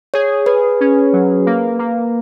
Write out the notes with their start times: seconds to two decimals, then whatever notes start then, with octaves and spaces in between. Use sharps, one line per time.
0.14 G#4 C#5
0.46 G#4 B4
0.81 C#4
1.13 F#3
1.46 A#3
1.79 A#3